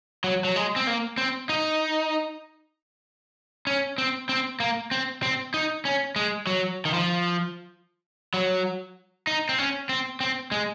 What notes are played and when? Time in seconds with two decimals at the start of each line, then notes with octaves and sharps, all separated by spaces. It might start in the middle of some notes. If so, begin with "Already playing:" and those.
0.24 F#3
0.45 F#3
0.56 G#3
0.76 C4
0.87 A#3
1.18 C4
1.49 D#4
3.67 C#4
3.98 C4
4.29 C4
4.60 A#3
4.91 C4
5.23 C4
5.54 D#4
5.85 C#4
6.16 G#3
6.47 F#3
6.85 D#3
6.94 F3
8.34 F#3
9.27 D#4
9.49 C4
9.58 C#4
9.89 C4
10.20 C4
10.52 G#3